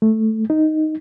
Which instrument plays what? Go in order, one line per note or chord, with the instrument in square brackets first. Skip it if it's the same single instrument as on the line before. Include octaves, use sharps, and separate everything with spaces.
[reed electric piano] A3
D#4